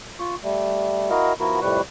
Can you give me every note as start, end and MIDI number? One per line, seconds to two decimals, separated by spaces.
0.19 0.35 65
0.19 0.35 85
0.44 1.10 55
0.44 1.10 57
1.10 1.33 64
1.10 1.33 66
1.10 1.33 70
1.10 1.33 75
1.10 1.33 77
1.40 1.60 53
1.40 1.60 59
1.40 1.60 64
1.40 1.60 66
1.40 1.60 70
1.62 1.81 41
1.62 1.81 45
1.62 1.81 48
1.62 1.81 55
1.62 1.81 71
1.62 1.81 85